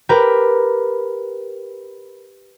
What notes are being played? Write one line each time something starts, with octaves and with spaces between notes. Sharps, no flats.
G4 A#4 B4